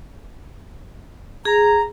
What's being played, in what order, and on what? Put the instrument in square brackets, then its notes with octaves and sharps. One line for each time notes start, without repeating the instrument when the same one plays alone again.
[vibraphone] G#4 [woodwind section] A#5